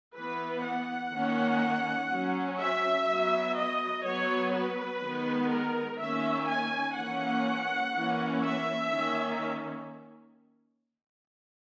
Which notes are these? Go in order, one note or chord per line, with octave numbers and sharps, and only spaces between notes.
E3 B3 B4
F#5
D#3 A#3 C#4
F#3 C#4
E5
F#3 B3
D#5
F#3 B3 C#5
B4
D#3 G#3 B3
A#4
D#3 A#3 C#4 E5
G#5
E3 A#3 C#4 F#5
E3 A#3 C#4
E5
D#3 A#3 C#4